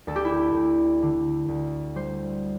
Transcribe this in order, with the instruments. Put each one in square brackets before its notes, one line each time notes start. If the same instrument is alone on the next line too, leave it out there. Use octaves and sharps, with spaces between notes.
[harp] D2 A4
G4
E4
G4
D2
D3
D2
G3 C5